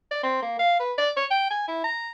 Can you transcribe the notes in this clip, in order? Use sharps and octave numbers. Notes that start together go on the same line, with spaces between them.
D5
C4
A#3
F5
B4
D5
C#5
G5
G#5
E4
A#5